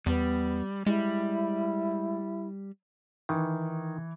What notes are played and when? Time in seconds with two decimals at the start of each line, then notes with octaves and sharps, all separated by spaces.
0.06 E2 G3 B3
0.87 G3 G#3 E4
3.29 D#3 E3